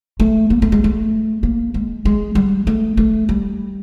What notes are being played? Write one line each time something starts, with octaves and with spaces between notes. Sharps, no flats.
A3
A#3
A3
G#3
A3
A#3
G#3
G#3
G3
A3
A3
G3